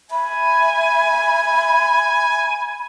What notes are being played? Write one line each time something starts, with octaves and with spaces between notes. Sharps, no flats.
E5 G#5 B5